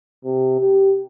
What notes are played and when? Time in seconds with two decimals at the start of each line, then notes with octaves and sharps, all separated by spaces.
0.25 C3
0.60 G4